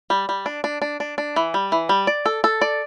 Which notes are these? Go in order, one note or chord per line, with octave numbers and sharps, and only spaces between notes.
G3
G3
D4
D4
D4
D4
D4
E3
G3
E3
G3
D5
A4
A4
D5